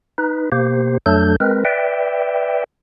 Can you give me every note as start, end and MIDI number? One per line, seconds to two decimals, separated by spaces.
0.18 0.50 63
0.18 0.50 71
0.52 0.98 47
0.52 0.98 58
0.52 0.98 67
0.52 0.98 72
1.06 1.36 41
1.06 1.36 54
1.06 1.36 57
1.06 1.36 62
1.06 1.36 69
1.06 1.36 91
1.40 1.64 56
1.40 1.64 60
1.40 1.64 70
1.40 1.64 71
1.65 2.64 71
1.65 2.64 74
1.65 2.64 76
1.65 2.64 79